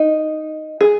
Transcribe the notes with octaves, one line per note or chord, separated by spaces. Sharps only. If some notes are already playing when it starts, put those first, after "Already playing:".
Already playing: D#4
G#4